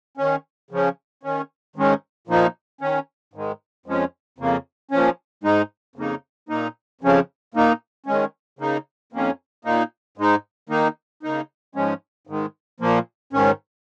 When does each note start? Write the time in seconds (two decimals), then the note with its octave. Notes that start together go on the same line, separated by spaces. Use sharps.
0.17 D#3 C#4
0.71 C#3 F3 C#4
1.23 D#3 C#4
1.76 G#2 D#3 G#3 C#4
2.27 A#2 F3 A#3 D#4
2.81 D#3 C#4
3.34 G#2 D#3 G#3
3.86 F2 F3 G#3 C#4
4.38 F2 C#3 A#3
4.91 A#2 F3 C#4
5.43 G#2 G#3 D#4
5.96 F2 C#3 A#3 D#4
6.49 A#2 A#3 D#4
7.01 F2 C#3 F3 C#4
7.54 A#2 A#3 D#4
8.06 D#3 G#3 C#4
8.59 C#3 A#3 D#4
9.13 F2 D#3 A#3 C#4
9.65 A#2 A#3 D#4
10.17 G#2 G#3 D#4
10.69 D#3 A#3 D#4
11.23 C#3 A#3 D#4
11.75 G#2 F3 G#3 C#4
12.27 G#2 D#3 G#3
12.80 A#2 F3 A#3
13.33 G#2 D#3 C#4